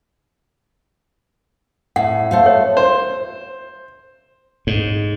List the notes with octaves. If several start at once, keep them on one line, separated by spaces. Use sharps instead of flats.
A2 F#5
A3 C5 F5
C#5
C5
G#2